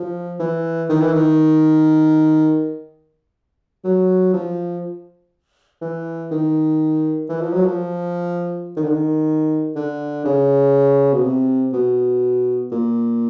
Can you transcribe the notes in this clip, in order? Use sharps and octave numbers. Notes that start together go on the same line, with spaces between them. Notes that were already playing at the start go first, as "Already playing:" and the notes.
Already playing: F3
E3
D#3
E3
D#3
F#3
F3
E3
D#3
E3
F3
F#3
F3
D#3
D3
D#3
D3
C#3
B2
C3
B2
A#2